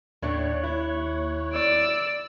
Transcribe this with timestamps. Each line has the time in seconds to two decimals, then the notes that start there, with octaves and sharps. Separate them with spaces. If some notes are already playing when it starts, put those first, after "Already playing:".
0.22 D#2 A2 A3 D4 C#5 F#6
0.64 E4
1.53 D5 E6